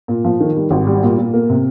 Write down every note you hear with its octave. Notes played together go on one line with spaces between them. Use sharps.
A#2
F3
D#3
G3
G#1
G3
A#2
A#2
A#3
C3